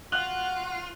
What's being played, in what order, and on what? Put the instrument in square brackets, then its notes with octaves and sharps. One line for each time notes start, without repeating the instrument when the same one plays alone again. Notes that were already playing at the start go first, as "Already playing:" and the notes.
[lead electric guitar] F4 [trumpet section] F#4 F#5 [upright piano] F#6 F#7